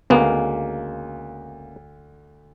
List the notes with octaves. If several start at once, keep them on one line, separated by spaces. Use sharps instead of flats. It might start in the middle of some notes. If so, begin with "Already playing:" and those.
D2 C#3 G#3 A#3 B3